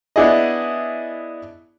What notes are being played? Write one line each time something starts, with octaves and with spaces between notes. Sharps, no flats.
B3 D4 E4 G#4 D#5